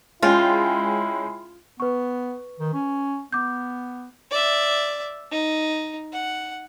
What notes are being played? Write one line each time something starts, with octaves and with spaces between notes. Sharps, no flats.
G#3 C#4 E4 F4 G5
B3 B4 C#6
D#3
C#4
B3 D6 G6
D5 E5
D#4
F#5